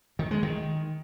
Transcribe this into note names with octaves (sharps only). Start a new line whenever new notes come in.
D#3
G#3
D#3